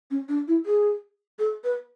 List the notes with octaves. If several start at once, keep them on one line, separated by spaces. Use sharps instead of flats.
C#4
D4
E4
G#4
A4
B4